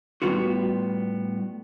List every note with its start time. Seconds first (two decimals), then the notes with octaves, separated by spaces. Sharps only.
0.22 A2 G3 G#3 B3 F4 F#4